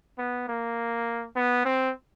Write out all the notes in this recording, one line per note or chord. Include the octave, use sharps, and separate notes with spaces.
B3
A#3
B3
C4